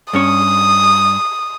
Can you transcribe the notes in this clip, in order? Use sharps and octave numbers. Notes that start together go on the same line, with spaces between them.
G2 C#4 C#5 D#6